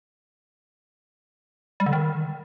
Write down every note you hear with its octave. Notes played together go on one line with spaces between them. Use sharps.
G3
D3
D#3